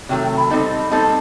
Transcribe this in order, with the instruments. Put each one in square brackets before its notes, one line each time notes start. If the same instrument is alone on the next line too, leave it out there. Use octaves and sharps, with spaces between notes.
[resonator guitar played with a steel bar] C3 D#3 F#3 A3 [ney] G5
[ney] G5
B5
[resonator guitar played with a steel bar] G3 C4 D#4 A4
[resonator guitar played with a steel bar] G3 C4 D#4 A4 [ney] A5